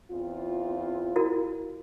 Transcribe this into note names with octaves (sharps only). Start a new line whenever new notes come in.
E2 C4 F4
E4 F#4 A#4